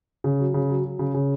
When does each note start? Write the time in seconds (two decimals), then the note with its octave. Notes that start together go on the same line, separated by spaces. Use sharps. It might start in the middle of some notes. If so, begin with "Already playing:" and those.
0.24 C#3
0.40 F#3
0.54 C#3
0.69 F#3
0.84 F#3
0.99 C#3
1.14 C#3